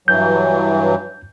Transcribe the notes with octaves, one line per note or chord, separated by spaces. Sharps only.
G2 E3 F#3 G6